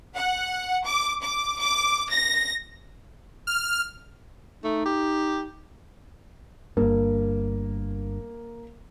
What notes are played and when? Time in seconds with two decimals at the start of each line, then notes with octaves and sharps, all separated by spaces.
0.15 F#5
0.85 D6
1.23 D6
1.60 D6
2.11 A#6
3.47 F6
4.64 A3 D#4
4.86 G4
6.77 G1 G2 A#3